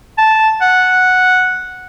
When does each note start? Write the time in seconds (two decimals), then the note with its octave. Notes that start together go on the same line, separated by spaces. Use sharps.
0.18 A5
0.61 F#5